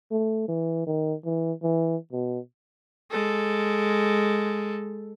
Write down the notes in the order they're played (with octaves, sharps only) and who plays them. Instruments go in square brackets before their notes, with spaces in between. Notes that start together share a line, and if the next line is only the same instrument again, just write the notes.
[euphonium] A3
E3
D#3
E3
E3
B2
[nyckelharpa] G#3 A4